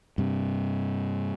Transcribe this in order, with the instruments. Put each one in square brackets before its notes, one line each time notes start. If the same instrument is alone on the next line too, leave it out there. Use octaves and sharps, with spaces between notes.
[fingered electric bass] G2 C3